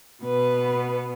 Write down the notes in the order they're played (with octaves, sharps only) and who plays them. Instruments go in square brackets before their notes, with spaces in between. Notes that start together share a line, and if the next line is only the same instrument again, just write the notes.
[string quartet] B2 B3 B4